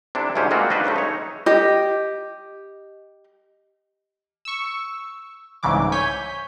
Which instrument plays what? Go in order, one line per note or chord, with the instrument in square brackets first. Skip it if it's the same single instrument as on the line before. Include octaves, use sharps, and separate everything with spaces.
[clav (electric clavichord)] C3 D4 E4 A4
D2 G#2 C#4 G4 C5
G3 G#3 A#3 C4 F4 F#4
D4 D#4 F4 F#4 B4 C5
G2 C#3 G3 A3
D#4 C#5
[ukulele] G4 D#5
[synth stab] C#6 E6
C2 G#2 C#3 E3 D6
C#5 G#5 G6 B6